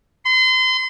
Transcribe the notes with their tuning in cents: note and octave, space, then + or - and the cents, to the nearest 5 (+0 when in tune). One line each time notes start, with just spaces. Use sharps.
C6 -35